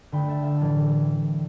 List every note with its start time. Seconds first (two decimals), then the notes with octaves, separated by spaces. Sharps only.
0.12 D3 A3 G5 B5
0.29 E5 A5
0.45 E5 A5
0.61 A2 E3 G3